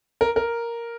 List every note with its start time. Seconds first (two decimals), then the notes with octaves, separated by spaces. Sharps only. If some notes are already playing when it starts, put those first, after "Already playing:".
0.21 A#4
0.36 A#4